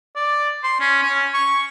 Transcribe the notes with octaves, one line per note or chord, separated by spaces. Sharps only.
D5
C6
C#4
C#4
C#6